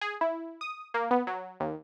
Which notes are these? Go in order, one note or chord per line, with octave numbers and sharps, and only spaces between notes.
G#4
E4
D#6
A#3
B3
F#3
D#2